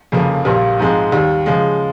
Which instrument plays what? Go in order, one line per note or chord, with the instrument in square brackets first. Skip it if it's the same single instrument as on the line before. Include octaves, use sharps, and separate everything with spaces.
[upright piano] F1 F2 C#3 F3 A#3
A#1 A#2 G3 A#3
G#2 F3 G#3 C4
D#2 D#3 G3
C#3 F3 G#3